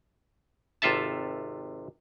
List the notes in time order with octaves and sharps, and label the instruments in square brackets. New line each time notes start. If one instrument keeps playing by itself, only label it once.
[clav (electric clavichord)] G#1 C3 F4 A4 E5 A5